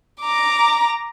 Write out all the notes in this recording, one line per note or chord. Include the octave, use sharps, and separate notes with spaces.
A#5 D6